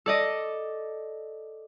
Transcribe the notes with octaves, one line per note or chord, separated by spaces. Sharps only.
A4 D5 D#5